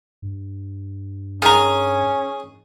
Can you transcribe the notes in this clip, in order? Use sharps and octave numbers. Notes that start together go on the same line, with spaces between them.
G2
D#3 C#4 G#4 G#5 A#5